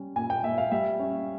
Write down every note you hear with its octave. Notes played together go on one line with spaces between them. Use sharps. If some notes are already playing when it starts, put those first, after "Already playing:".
Already playing: G3 C#4
A#2 G#5
G5
A#2 E5
F5
G3 E5
C#4